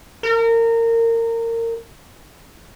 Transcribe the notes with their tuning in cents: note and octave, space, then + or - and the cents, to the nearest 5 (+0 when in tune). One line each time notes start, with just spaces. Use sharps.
A#4 -25